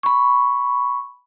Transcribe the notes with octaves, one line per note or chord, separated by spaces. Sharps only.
B5 C#6